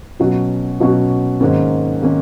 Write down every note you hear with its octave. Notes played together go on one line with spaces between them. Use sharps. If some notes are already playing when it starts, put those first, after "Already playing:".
B2 F#3 C#4 F#4
B2 F#3 C#4 F#4
G#2 D#3 A#3 C#4
D#3 A#3 C#4